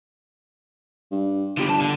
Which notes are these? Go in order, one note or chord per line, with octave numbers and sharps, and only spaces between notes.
G2
G1 D3 G4
G2 A5
D3